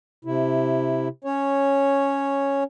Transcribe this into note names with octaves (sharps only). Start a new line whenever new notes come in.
C3 E4
C#4 C#5